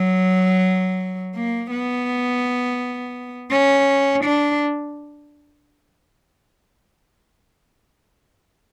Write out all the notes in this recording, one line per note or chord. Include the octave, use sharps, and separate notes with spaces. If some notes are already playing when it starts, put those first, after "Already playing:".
Already playing: F#3
A#3
B3
C#4
D4